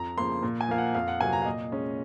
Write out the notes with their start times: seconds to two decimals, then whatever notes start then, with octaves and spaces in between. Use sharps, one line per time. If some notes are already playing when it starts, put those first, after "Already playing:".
Already playing: F2 A#5
0.17 C#3 F3 A#3 C6
0.43 A#2
0.61 G#5
0.69 F3 A#3 F5
0.78 F#5
0.95 F2 F5
1.08 F#5
1.21 C3 F#3 A#3 G#5
1.33 A#5
1.42 F5
1.46 A#2 D#5
1.72 G#3 C#4